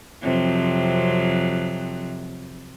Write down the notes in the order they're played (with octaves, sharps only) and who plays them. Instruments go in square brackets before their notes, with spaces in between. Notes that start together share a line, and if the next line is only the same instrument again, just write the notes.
[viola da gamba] F2 C3 F#3